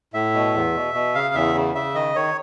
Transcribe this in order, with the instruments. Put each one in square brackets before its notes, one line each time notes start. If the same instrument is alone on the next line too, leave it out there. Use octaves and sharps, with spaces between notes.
[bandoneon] A2 E5
B2
E2
B2
B2
C#3 F5
E2 E5
C#3
C#3 E5
D#3 D#5
D#3 C#5